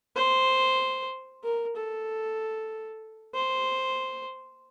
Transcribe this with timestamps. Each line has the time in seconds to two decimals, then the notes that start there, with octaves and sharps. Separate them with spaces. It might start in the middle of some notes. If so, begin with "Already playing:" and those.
0.16 C5
1.44 A#4
1.76 A4
3.34 C5